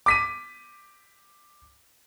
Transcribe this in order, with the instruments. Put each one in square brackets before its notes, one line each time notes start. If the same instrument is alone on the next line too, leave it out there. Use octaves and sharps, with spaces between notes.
[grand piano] D6 B6 D#7